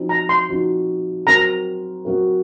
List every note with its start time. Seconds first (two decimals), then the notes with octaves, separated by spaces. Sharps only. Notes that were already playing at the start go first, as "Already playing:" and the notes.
Already playing: F3 C4 D#4 F#4
0.09 A#5
0.29 C6
0.49 F3 C4 D#4 F#4
1.27 F#3 C4 F#4 A#4 A#5
2.05 F#3 C4 F#4 A#4